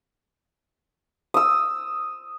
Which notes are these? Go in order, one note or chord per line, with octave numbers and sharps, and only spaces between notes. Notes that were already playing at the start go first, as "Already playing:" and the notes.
D#6 E6